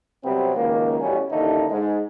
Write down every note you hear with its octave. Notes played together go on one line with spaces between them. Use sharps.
C3 F#3 G3 B3 C4
C#2 F#2 D#3 A#3
A1 B2 G3 C#4
A1 D#2 D3 A3 A#3 D#4
G#2 G#3